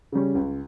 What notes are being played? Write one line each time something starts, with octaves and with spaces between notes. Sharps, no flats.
C#3 G3 C#4
C#2